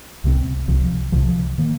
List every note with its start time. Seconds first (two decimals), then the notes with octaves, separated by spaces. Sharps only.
0.24 C2 C3 G#3 C4
0.68 C2 C3 F3
1.12 C2 C3 F3
1.58 D#3 A#3